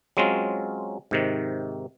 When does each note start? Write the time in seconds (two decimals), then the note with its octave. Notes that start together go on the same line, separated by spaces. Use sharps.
0.17 F#3 G#3 C4 C#4 F4
1.11 G#2 C3 D#3